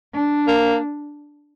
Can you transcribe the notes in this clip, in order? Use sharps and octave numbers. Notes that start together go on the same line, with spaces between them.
D4
A#3